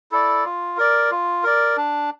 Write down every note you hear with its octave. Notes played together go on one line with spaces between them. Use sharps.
E4 A4 D5
F4
A#4 D5
F4
A#4 D5
D4